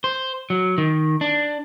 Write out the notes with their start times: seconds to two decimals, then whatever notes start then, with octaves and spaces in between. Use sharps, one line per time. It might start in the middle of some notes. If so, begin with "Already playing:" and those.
0.04 C5
0.50 F#3
0.78 D#3
1.21 D4